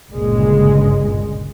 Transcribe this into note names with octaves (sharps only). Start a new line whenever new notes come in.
G1 C#2 A#2 C#3 G#3